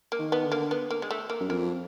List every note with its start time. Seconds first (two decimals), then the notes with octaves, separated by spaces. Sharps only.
0.12 A#3
0.19 D#3
0.32 B3
0.45 D3
0.52 A#3
0.71 B3
0.91 A#3
1.02 G#3
1.11 A3
1.30 A#3
1.40 F#2
1.49 F2 A#3